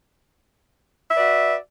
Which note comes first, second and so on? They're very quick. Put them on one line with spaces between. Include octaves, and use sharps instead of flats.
E5 D5 B4 F#4